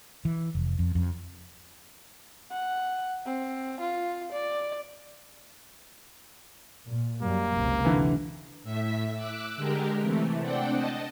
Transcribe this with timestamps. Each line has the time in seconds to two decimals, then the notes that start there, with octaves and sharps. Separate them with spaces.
0.25 E3
0.55 F1
0.79 F2
0.95 F2
2.52 F#5
3.26 C4
3.80 F4
4.32 D5
6.86 A#2
7.22 F#2 G3 A#3
7.53 F#1 C#2 C3
7.85 D3 E3
8.64 A2 E5 B6
9.15 D6 E6 F#6
9.56 D3 G#3 G4 A#4
10.00 C3 E3 A3
10.41 C4 D4 D5 F#5 G5
10.72 D#5 A5